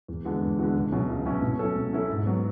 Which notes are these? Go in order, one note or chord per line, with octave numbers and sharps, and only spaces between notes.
E2
D3 G#3 B3 F#4
E2
D3 G#3 B3 F#4
C#2
B2 F#3 C#4 E4
C#2
B2 F#3 C#4 E4
B2
F#3 C#4 E4 A4
B2
F#3 C#4 E4 A4
G#2
F#3 B3